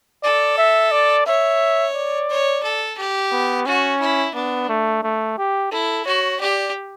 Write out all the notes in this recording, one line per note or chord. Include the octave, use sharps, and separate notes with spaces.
A4 D5
E5
D5
C#5 E5
D5
C#5
A4
G4
B3
C#4 F#4
E4
B3 D4
A3
A3
G4
E4 A4
F#4 C#5
G4 D5